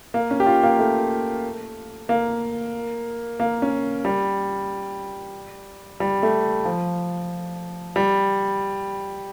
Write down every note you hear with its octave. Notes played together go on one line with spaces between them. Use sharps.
A#3
C#4
G4
F4
A#3
A3
A#3
A#3
C#4
G3
G3
A3
F3
G3